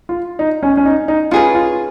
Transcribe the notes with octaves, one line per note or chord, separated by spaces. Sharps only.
F4
D#4
C#4
C#4
D#4
D#4
C#4 F4 G#4 B4
F4